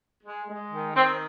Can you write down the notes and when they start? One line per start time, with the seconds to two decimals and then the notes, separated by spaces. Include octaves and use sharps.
0.24 G#3
0.47 G#3
0.72 D#3
0.95 D#3 C4